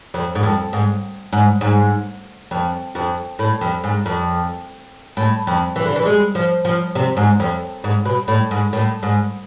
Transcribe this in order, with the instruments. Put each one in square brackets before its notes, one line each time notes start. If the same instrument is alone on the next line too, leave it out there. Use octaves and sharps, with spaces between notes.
[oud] F2
G#2
F2
G#2
G#2
G#2
F2
F2
A2
F2
G#2
F2
A2
F2
E3
D3
E3
G#3
F3
F3
C3
G#2
F2
G#2
B2
A2
G#2
A2
G#2